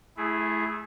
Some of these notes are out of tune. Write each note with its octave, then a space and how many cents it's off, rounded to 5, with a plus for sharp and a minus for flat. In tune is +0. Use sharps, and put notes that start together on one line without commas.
A3 -30 E4 +0 G#4 +0